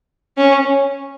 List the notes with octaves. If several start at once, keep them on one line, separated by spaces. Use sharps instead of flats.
C#4